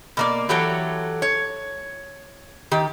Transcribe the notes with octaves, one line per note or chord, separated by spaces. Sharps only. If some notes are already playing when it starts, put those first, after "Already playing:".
B2 A#3 D5
E3 F#3 G4 A4 C#5
C#5
D#3 G4